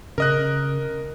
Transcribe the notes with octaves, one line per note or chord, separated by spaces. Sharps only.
C#3 A#4 D#5 F#6